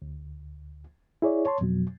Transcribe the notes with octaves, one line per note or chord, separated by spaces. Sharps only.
D2
E4 G#4 C#5 D5
C#5 A5 C6
F2 B2 F#3